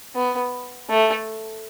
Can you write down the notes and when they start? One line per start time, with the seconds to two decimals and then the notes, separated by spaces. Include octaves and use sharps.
0.15 B3
0.90 A3